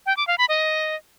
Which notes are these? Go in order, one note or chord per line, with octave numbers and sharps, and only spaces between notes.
G5
D6
F5
B5
D#5